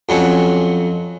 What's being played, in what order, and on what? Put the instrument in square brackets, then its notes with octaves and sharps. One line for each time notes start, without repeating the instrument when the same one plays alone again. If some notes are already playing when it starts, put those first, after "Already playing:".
[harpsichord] F2 F#3 C#4